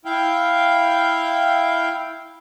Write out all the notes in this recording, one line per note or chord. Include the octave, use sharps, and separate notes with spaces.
E4 F5 G5